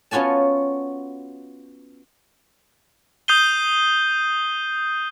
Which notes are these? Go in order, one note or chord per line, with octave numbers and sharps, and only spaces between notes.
B3 C#4 F4 F#4 G#5 A5
D#6 G6 C7 D#7 G7